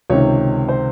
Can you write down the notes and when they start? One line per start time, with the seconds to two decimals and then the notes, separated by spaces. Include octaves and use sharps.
0.10 C#2 C3 D#3 C#5
0.68 C5